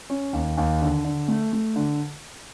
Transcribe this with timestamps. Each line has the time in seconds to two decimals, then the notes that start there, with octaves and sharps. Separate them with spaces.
0.10 C#4
0.33 D#2
0.57 D#2
0.81 D3
1.05 D3
1.28 A3
1.53 A3
1.76 D3